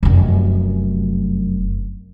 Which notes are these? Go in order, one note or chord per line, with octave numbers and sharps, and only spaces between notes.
F1 F#2